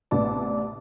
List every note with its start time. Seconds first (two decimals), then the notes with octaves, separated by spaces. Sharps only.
0.11 A1 C3 B3 D4 A5 D6